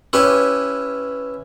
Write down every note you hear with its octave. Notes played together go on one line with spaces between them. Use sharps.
C#4 E4 G4 B4